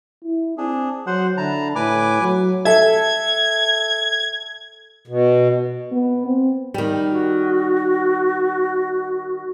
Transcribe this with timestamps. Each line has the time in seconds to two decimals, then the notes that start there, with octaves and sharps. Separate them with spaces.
0.24 E4
0.58 C4 D4 G#4
1.07 F#3 C5 F#5
1.37 D3 E4 A5 A#5
1.76 A2 B4 G#5 D6
2.21 F#3
2.65 A4 E5 G#6
5.08 B2
5.92 B3
6.26 C4
6.74 D#3 G3
7.11 F#4